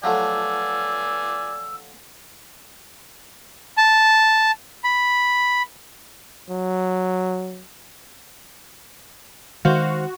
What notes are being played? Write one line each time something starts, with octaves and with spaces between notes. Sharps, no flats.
F3 F#3 A3 D5 G#5 E6
A5
B5
F#3
D#3 G#3 F#4 C5 F5